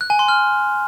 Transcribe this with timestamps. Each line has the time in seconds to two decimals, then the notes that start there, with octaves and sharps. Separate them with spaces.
0.01 F#6
0.10 G#5
0.19 C6
0.28 F6